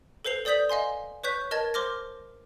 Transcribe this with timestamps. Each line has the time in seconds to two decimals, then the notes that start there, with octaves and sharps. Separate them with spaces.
0.25 A4 B4 C5 C7 F7
0.45 A4 D5 D#6 G6 B6 F#7
0.69 D#5 F5 G#5 C6
1.24 B4 C#5 C#6 F#6 G6 B6
1.51 A#4 D#5 A5 G#6 A6
1.74 C5 C6 D6 F6 A#6